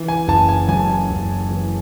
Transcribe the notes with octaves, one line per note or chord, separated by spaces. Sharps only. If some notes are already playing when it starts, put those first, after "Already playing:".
Already playing: E3
G#5
F#1 A5
G#5
F#2 G#5
A5
G#5
F#1
E3